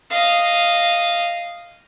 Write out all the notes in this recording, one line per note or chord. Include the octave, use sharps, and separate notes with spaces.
D#5 F5